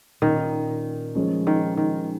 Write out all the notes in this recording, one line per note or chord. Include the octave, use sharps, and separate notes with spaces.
A#2 D#3 A#3 C#4
F3 G#3 C#4 F4
D#3
D#3